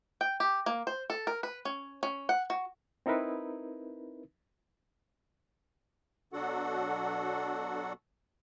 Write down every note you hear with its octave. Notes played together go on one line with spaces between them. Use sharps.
G5
G4
A#3
C5
A4
A#4
B4
C#4
C#4
F#5
F#4
C4 D#4 E4 A#4 B4
B2 F#3 D4 F#4 A4 F#5